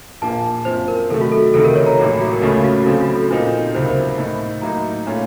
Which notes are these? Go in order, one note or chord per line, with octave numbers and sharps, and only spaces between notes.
A#1 A#2 F3 A#3 A5
F#2 F3 C4 C5
A#4
C3 D#3 F#3 A3 A4
F#4
A4
A4
C#2 C3 D#3 A4
A#4
C#5
A#5
A1 A2 F#3 A#3
F#4
A#4
C#2 C#3 A3 C#4 F4 A4
F#4
C#3 F#3 C4 A4
F#4
A4
A#2 F3 C4 D#4 A#4
C#2 C3 F#3 C5
A#4
C5
A2 A3 D#4
A2 F#3 A#3 D#4 A#5
A#2 A3 C#4 F4